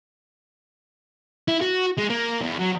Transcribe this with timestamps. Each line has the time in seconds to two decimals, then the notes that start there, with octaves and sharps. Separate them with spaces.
1.48 E4
1.61 F#4
1.98 G#3
2.10 A#3
2.41 E2
2.59 F#3